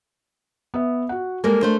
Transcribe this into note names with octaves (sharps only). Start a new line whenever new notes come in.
B3 E5
F#4 F#5
G3 G#3 A#3 A4 A#4
A3 D4 C5